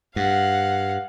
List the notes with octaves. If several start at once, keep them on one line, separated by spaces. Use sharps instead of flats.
G2 F5 F#5